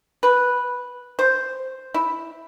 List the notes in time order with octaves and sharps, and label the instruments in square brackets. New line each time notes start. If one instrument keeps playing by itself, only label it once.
[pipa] B4
C5
E4